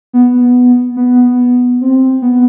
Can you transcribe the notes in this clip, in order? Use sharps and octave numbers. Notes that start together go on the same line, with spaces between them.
B3
B3
C4
B3